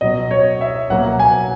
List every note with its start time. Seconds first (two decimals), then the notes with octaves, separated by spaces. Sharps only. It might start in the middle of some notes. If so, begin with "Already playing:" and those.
0.01 B2 F#3 B3 D#5
0.31 C#5
0.61 E5
0.90 B2 F#3 A#3 F#5
1.19 G#5